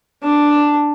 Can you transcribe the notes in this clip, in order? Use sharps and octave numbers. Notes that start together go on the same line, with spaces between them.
D4 A5